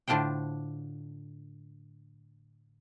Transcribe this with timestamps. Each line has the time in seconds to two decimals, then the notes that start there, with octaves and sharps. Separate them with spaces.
0.08 A2 D3 D4 F4 C5 G5